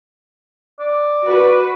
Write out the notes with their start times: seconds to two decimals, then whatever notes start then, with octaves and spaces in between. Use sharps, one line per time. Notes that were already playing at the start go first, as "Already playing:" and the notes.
0.80 D5
1.27 F#4 B4